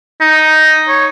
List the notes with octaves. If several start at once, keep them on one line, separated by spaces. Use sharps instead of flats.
D#4
C#5